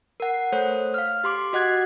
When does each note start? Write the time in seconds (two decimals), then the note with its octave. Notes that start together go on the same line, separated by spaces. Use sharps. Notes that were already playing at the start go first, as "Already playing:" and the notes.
0.20 A#4 F#5
0.52 A3 A4 C5 C#5
0.94 F5 F6
1.24 G4 C6 D6
1.53 F#4 D#5 F#5 F#6 G#6